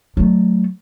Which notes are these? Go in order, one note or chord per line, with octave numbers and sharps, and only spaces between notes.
F#3 A3